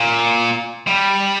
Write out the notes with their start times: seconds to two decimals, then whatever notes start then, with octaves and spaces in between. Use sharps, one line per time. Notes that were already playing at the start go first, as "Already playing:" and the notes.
Already playing: A#2
0.87 G3